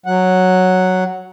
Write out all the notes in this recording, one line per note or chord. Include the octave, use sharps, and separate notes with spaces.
F#3 F#5